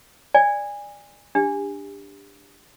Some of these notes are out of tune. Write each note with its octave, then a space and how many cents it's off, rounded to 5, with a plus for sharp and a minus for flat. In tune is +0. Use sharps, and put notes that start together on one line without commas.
D5 +0 G#5 -25
D4 +0 G4 +25